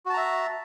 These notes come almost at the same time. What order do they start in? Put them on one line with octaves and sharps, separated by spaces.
F#4 A5 A#5 E5